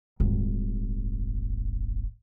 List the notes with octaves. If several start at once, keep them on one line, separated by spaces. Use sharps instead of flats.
D#1 G#1